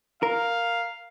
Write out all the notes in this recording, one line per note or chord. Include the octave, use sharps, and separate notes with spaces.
A#4 F5